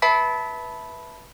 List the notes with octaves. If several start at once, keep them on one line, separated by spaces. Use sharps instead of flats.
B4 E5 A5 B5 B6